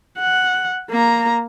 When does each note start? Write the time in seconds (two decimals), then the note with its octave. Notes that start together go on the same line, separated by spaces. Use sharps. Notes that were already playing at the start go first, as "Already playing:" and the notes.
0.19 F#5
0.90 A#3 A#5